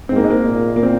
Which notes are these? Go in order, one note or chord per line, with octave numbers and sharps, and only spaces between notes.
G#2 C4
A#3
G#3
A#3
A#2
A#3
C4